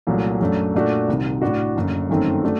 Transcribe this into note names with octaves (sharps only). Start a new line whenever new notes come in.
C2 A#2 F#3 A3
F#2 F#3 A3 D4
A#2 A3 D4 F#4
C2 C3 D#3
A2 A3 D4 F#4
F#1 F#2 D3
G1 F#2 D#3 A3 C4
A3 D4 F#4